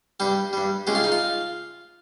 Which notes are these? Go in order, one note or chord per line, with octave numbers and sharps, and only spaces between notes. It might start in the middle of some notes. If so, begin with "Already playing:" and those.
G2 G3 G4
G2 G3
C#2 C#3 G#3 G4
F4
D#4
F4